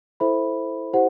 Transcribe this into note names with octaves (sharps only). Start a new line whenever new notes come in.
E4 A4 C5 E5 B5
E4 G4 C5 F#5